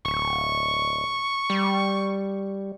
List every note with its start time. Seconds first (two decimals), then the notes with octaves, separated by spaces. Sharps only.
0.05 D1 C#6
1.50 G3